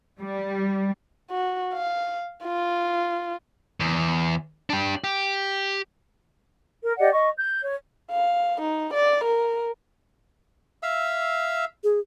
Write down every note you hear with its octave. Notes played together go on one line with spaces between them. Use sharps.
G3
F#4
F5
F4
E2
D4 G4
G4
A#4
G4 D5 D#5 F#5
D#5 C#6
G6
C#5
F5
D#4
D5
A#4
E5 F5 E6
G#4